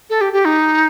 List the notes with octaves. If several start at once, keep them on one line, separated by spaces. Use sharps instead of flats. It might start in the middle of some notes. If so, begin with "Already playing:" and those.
A4
G4
G4
D#4